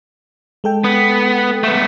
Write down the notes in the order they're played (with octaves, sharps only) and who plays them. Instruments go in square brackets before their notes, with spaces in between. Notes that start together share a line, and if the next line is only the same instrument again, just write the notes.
[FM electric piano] G#3 A4 G5
[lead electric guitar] B3
A3 B3